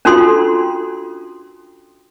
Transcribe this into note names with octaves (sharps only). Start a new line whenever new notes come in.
C#4 D4 F4 F#4 A4 C6